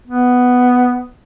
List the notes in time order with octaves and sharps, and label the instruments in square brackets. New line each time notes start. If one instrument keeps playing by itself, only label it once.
[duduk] B3